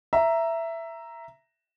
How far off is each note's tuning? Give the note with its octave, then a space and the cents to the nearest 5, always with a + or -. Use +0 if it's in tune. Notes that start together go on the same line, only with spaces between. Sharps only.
E5 +10 A#5 +0